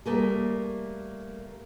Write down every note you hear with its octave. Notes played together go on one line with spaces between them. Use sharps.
G3 A3 A#3 G#4